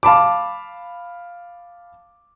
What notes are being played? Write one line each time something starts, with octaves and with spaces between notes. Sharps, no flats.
F5 A5 B5 D6